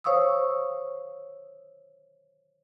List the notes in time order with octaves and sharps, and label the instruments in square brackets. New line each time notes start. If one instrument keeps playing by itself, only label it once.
[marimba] C5 C#5 F5 C#6 D#6 E6